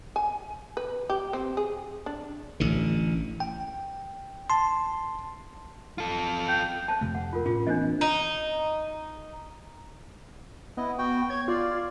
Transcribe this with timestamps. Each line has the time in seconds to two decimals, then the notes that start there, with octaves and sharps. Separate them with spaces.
0.16 G#5
0.77 B4
1.10 G4
1.33 C4
1.57 G#4
2.06 D4
2.60 A1 D3
3.40 G5
4.50 A5 C6
5.98 F4 A4
6.49 G5
6.88 C5 A5
7.01 F2 C3 A3
7.15 F#5
7.33 F4 A#4
7.46 A2 C#4 F4
7.67 E3 A#3 C4 D4 C5 D#5
8.01 D#4
10.77 B3 E4 D#5
10.98 F#4 G5
11.30 C#5 G#6
11.48 F4 D5